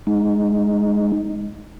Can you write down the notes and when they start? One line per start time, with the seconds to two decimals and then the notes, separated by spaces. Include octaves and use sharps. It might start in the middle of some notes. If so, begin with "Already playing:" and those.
0.07 G#3 D#4